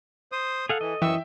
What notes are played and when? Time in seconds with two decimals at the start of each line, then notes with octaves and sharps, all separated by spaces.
0.32 C5 D#6
0.69 G#4 A4 F5 F#5
0.81 E3 D#5
1.02 F#2 E3 E5 G5 C#6 E6